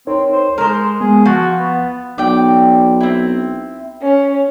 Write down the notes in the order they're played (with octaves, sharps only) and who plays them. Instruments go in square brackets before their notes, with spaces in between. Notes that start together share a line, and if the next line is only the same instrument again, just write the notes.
[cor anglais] C4 [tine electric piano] D#4 A#4 C#5
[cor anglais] C5
[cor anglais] G#3 [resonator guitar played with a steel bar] A#4 C5 [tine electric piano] F6
[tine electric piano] G#3 B3 [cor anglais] G#4
[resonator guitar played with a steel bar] F3 [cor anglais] F#4 [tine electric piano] F5 F#5 A6
[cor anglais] B3
[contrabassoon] B1 [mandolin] D5 G5
[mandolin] C4 E4
[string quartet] C#4